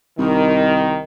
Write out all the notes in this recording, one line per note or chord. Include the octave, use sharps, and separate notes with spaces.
C2 D#3